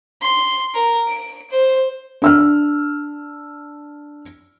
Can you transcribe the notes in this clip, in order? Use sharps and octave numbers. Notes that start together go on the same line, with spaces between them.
C6
A#4
D7
C5
D4 E6 F6